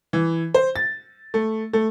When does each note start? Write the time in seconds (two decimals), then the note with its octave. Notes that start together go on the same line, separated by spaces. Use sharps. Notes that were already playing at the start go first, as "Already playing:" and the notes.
0.13 E3
0.54 C5
0.76 A6
1.34 A3
1.73 A3